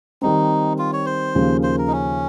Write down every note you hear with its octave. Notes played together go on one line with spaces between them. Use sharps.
D#3 G3 C4 D#4
F4
C#5
C5
D#2 C#3 F3 A#3
C5
A#4
D#4
C#4